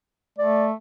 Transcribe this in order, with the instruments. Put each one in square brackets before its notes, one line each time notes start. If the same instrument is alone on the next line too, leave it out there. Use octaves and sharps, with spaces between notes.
[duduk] A3 [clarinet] D5